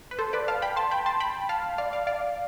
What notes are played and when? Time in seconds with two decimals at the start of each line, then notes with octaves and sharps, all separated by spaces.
0.11 B4
0.19 A4 C5
0.33 B4 D5
0.48 F5 A5
0.62 G5 B5
0.76 A5 C6
0.91 G5 B5
1.06 A5 C6
1.20 G5 B5
1.49 F5 A5
1.78 D5 F5
1.93 D5 F5
2.07 D5 F5